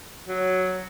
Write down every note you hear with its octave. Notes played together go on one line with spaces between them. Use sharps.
F#3